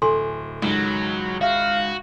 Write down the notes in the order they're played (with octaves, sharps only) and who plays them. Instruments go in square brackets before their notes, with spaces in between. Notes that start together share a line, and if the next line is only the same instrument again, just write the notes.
[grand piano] D1 [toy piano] A4 G#5 C6
[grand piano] C#2 G#2 D#3 [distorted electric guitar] F#3
[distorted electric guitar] F#4 [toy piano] E5 [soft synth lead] F5